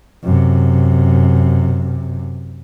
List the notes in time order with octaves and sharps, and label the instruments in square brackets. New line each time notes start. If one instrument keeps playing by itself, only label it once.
[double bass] F#2 C3